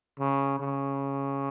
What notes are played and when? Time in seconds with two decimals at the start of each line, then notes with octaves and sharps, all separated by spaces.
0.19 C#3
0.59 C#3